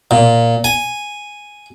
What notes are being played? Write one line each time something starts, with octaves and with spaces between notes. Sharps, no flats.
A#2
G#5